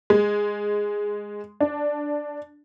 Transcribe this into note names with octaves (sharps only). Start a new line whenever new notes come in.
G#3
D4